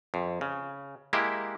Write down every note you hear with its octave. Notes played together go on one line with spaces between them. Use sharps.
F2
C#3
G#3 A#3 E4 G4